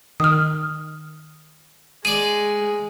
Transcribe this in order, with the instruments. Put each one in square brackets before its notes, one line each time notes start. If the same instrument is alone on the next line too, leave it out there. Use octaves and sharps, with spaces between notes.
[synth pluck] D#3 [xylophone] D#6 F6
[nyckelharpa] G#3 [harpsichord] G#4 D5 [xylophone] D#7